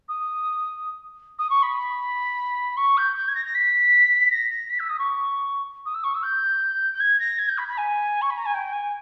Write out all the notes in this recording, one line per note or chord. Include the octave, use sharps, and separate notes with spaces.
D#6
D#6
C#6
B5
C#6
G6
G6
G#6
A#6
A#6
B6
A#6
A#6
B6
E6
D#6
C#6
D#6
E6
C#6
E6
G6
G6
G#6
A#6
G#6
G6
B5
B5
G#5
C#6
B5
A#5
G#5
G5
G#5